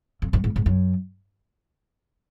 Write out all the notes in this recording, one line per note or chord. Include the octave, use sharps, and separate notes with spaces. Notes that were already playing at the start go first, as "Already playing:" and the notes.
F2
G2
G#2
G#2
F#2